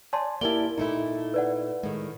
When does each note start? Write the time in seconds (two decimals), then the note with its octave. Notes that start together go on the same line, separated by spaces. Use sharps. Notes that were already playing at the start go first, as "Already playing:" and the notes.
0.13 C#5 D5 G#5 A5 C6
0.41 A#3 E4 G4 A#4 D5 A5 G7
0.78 A#2 A3 D#4 E4
1.34 B4 D5 F#5
1.83 A2 D#3 G#3